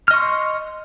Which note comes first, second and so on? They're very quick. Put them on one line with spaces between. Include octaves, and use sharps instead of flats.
F6 D#5 C#6 C6